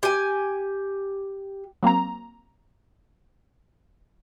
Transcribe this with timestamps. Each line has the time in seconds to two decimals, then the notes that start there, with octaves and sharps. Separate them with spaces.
0.03 G4 G#5
1.83 F#3 A#3 C4 A#5